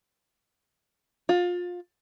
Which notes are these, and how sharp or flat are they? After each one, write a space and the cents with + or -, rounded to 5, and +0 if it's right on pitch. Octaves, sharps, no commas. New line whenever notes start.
F4 +25